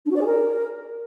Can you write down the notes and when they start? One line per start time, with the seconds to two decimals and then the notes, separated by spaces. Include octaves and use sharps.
0.05 D4
0.10 F#4
0.15 D5
0.21 G#4
0.26 A#4